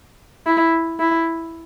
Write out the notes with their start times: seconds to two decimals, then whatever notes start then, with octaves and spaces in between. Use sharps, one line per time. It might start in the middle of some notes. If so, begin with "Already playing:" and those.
0.47 E4
1.00 E4